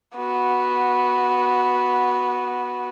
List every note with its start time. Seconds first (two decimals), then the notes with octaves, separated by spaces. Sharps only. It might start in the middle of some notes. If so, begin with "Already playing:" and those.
0.16 B3 F#4